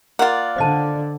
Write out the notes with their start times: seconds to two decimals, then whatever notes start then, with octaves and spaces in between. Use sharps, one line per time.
0.19 A#3 F4 D5 F#5
0.56 D3 C5 D#5 A5